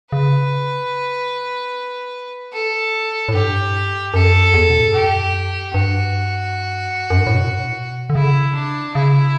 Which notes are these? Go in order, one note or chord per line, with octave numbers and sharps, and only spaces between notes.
C#3 B4
A4
A2
G2 G4
F#2 A4
E2
B2
A2
G2
F#2 G4
G2 F#4
F#2
G2
A2
B2
D3
C#3 E4
D4
C#3 E4